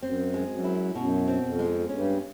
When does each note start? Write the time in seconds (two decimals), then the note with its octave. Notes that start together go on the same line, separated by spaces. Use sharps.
0.02 F#2 C4
0.34 G#3
0.49 F#2
0.64 E4
0.95 F#2 B2
1.28 C4
1.43 F2
1.59 G#3
1.89 G2 C#4